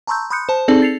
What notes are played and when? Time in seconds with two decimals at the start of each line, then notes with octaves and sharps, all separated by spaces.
0.07 A5 A#5 C6 C#6 E6 G6
0.30 B5 C6 D#6 F#6 G6 C#7
0.49 C5 A5
0.68 C4 D#4 G#4 A4 D5 A5
0.82 A6 C7 C#7 F7